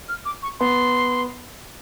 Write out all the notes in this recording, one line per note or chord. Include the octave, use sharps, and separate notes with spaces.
F6
D6
C#6
B3 C6